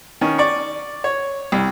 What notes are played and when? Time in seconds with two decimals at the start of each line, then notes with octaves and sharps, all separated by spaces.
0.21 D#3 C#4
0.38 D5 C#6
1.04 C#5
1.52 C2